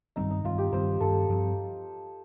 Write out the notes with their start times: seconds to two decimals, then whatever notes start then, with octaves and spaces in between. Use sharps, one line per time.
0.16 G2 D#3 G3 C4 D#4
0.31 D#4
0.44 G2 D#3 G3 C4 F4
0.58 G4
0.73 G2 D#3 G3 C4 C5
1.00 G2 D#3 G3 C4 A4
1.29 G2 F3 C4